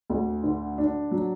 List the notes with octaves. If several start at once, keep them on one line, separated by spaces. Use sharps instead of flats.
D2
D3
D4
F#3